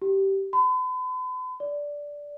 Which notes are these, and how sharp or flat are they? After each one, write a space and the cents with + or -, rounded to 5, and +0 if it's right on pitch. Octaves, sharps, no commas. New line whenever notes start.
G4 -15
B5 +45
D5 -10